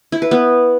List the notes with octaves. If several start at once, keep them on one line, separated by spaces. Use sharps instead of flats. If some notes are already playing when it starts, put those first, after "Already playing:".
E4
B4
B3